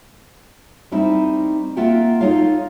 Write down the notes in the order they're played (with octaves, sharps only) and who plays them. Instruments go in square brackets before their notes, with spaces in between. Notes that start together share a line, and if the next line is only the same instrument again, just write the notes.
[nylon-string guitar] G3 A3 C4 D#4 E4
A#3 F4 E5 F#5 G5
D#4 F4 A4 C#5 F5